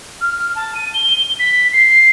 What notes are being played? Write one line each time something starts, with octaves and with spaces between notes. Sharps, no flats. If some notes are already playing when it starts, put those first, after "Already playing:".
F6
A5
D#7
G7
B6
C7